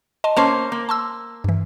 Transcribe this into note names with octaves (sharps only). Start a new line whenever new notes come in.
D#5 A5 C6
A#3 C#4 C5 C#5 A5
A#3
A5 C6 E6
G2 E3